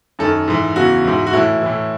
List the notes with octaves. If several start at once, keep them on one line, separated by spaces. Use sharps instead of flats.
F#2 D#3 A4
G#2 E3
E2 C#3 E3 F#4
G#2 E3
F#4
A2 E3 E4
A2 E3